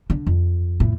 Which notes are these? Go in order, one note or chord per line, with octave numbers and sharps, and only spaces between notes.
D3
F2
A2